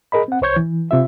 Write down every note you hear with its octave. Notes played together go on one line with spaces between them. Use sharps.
G#4 A#4 D#5 B5
C4 F#5
C2 C5 C#5 C#6 G6 G#6
E3
C3 F4 E5